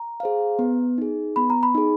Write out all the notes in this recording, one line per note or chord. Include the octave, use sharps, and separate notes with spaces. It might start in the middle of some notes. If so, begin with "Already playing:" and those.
Already playing: A#5
G#4 C5 F5
B3
D#4 G#4
B3 B5
A#5
B5
D#4 G#4